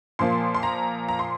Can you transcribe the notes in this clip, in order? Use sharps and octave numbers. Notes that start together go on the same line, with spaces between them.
A#2 F3 A#3 C6
C6
A#5
A#5
C6